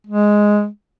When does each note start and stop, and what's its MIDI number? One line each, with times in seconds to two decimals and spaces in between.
0.07 0.67 56